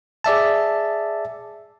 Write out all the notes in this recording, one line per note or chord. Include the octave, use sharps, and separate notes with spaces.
G#4 D5 E5 A5